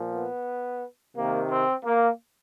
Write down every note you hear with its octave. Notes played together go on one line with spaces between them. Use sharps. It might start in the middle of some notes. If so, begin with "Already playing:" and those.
Already playing: A#2 F3
B3
C3 D#3 A#3
C4
A#3